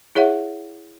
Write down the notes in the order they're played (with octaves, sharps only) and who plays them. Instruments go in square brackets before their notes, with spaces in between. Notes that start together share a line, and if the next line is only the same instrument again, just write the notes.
[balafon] E4 G#4 C#5 E5 F#5